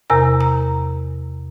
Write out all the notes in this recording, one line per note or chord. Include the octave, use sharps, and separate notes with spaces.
E2 C3 A#4 A#5
A#5